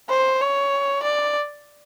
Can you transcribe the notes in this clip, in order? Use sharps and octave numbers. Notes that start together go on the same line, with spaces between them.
C5
C#5
D5